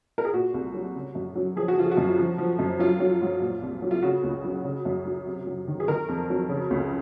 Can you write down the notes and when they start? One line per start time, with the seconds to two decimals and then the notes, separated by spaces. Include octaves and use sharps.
0.18 A#4
0.25 G#4
0.33 A#2 F#4
0.54 C2
0.74 F#3
0.95 C#3
1.15 F#2
1.35 F#3
1.56 F3 G#4
1.68 F#4
1.77 F3 F4
1.91 F#4
1.97 F#2
2.19 F3
2.38 F3
2.59 F#2
2.79 F#3 F4
3.00 F#3
3.21 G#2
3.41 A#2
3.63 C2
3.82 F#3
3.91 F4
4.02 C#3 F#4
4.24 C#2
4.45 F#3
4.65 C#3
4.85 F#2
5.05 F#3
5.26 C3
5.47 F#3
5.68 D#3
5.80 G#4
5.88 D#3 A#4
6.09 F2
6.30 F#3
6.49 C#3
6.71 C#2